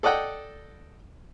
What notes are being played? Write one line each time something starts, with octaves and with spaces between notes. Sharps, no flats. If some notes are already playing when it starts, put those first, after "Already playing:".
A4 D5 D#5 F#5 G5